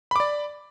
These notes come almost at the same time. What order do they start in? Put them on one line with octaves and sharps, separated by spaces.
B5 D6 D5